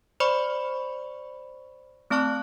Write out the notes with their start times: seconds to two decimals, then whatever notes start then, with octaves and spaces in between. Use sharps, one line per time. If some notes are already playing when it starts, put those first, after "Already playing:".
0.20 C5 D5 B5 C#6
2.10 A3 C4 D5 A5 C#6 F#6